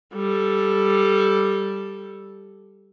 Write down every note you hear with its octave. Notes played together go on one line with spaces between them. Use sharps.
G3 A4